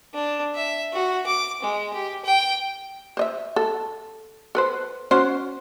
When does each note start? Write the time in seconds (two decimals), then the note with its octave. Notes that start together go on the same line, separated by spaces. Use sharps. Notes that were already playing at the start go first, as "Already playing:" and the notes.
0.14 D4
0.55 E5
0.93 F#4
1.27 D6
1.63 G#3
1.93 G4
2.25 G5
3.17 C5 D#5 E5
3.56 A4
4.55 A4 B4 C5
5.11 C#4 F#4 C5